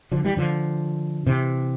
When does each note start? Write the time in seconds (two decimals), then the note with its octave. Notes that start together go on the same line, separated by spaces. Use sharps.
0.12 D3 F3
0.25 E3 G3
0.37 D3 F3
1.26 C3 E3